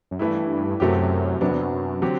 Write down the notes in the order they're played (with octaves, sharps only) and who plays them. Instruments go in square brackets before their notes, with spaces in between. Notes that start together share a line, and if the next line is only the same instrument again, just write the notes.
[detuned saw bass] F#2
[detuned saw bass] G2 [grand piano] E3 A3 E4
[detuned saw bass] F#2 [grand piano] C3 F#3 A3 C4 G4
[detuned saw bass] F#2 [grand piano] C3 F#3 B3 D4
[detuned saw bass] E2
F#2
F#2
[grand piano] D3 F#3 C4 G4